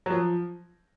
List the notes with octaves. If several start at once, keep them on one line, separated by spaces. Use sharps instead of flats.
F#3
F3